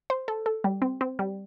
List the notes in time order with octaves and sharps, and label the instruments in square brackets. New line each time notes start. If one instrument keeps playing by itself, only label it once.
[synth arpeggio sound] C5
A4
A4
G3
C4
C4
G3